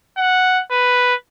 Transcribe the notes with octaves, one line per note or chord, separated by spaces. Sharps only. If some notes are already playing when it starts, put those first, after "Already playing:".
F#5
B4